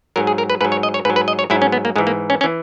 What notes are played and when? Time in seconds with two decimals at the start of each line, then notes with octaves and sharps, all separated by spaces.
0.16 G#2 F#3 A#4
0.27 G#4
0.38 A#4
0.50 B4
0.61 G#2 F#3 B4
0.72 C#5
0.83 D#5
0.94 C#5
1.05 G#2 B4
1.10 F#3
1.16 B4
1.28 D#5
1.39 C#5
1.50 G#2 F#3 E4
1.62 C#4
1.72 B3
1.85 A#3
1.96 G#2 E3 G#3
2.07 A#3
2.30 C#4
2.41 C#4
2.44 E3